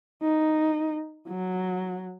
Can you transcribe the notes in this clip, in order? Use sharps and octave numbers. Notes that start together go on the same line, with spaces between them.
D#4
F#3